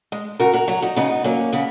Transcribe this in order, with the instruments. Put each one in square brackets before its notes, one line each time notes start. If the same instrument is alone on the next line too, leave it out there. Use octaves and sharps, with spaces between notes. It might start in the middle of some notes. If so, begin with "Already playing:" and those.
[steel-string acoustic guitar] G#3
C#3 F#4 A#4
F#4 A#4
F#3 F#4 A#4
D#4 F#4
C#3 B3 D#4
F#3 A#3 C#4
C#3 B3